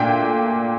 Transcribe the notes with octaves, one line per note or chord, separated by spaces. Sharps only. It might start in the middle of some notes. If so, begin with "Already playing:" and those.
Already playing: A#2 A3 D4 G5